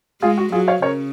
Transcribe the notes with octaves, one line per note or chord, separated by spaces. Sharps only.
G#3 F4 G#4
F#4
F#3 F4 G#4
C#5 F5
C#3 A#4 C#5